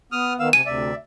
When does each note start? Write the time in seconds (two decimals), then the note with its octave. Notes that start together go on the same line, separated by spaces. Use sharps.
0.12 B3 D#6 F6
0.39 D#3 B3 F5 E6
0.53 C3 G#5 D#7
0.66 D2 C3 D5 E5